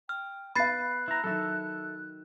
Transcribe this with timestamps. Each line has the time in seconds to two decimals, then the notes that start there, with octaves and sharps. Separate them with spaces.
0.09 G5 F6
0.55 B3 F5 B5 F#6 A6 C7
1.08 E4 A#5
1.24 D#3 F#3 A4 E5